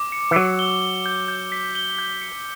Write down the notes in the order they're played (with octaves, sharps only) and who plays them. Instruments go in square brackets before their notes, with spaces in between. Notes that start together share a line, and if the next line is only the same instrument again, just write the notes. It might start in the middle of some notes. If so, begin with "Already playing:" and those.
Already playing: [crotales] D6
C#7
[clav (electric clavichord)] E3
[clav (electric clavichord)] F#3 [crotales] E6
[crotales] G7
G7
G6
G6
B6
G7
G6
C#7